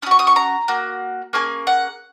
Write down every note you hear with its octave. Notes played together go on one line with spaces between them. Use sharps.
C#4 F#4 C#6 D#6
D#6
C#6
A#5
A#3 F#4
A#3 C#4 G#4 G#5
F#5